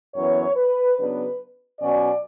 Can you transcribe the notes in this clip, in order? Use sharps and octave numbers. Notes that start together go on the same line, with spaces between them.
F#2 E3 B3 C#5
B4
C#3 F#3 B3 D4 B4
B2 F#3 C#4 D5